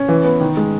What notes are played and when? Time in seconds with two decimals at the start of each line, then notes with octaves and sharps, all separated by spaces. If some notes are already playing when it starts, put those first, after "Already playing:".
Already playing: C#4
0.09 E3
0.24 B3
0.41 D#3
0.57 G#3